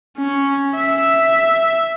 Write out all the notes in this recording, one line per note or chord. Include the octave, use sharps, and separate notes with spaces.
C#4
E5